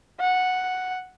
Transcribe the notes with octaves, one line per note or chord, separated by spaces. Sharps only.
F#5